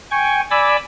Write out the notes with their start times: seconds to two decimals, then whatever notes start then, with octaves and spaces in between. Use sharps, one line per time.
0.11 G5 G#5 C#6
0.50 D5 G#5 B5 D6 E6